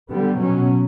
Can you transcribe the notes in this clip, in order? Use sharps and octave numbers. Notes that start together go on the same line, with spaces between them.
D3 G3 B3
B2 F#3 C#4